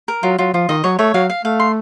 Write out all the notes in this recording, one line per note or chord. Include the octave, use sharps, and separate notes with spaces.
A#4
F#3 F4
F#3 F4
F3 F4
D#3 D#5
F#3 C#5
A3 C#5
F#3 F5
F5
A3 F5
C6